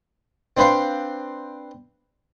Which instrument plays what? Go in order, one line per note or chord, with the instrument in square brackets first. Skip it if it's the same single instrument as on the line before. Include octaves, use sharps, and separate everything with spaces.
[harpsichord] C4 D4 B4 C5 F5